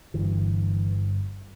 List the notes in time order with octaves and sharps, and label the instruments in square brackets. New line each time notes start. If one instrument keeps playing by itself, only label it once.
[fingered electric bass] G1 G2 D3 E3